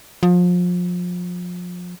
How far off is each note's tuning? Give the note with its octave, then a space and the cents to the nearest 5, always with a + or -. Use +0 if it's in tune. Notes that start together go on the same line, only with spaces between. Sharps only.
F3 +30